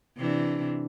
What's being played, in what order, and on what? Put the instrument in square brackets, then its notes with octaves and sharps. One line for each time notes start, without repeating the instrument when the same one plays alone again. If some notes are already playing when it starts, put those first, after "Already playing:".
[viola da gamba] C3 E3 D4